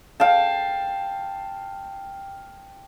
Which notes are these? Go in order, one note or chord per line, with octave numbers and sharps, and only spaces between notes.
F5 G5 A5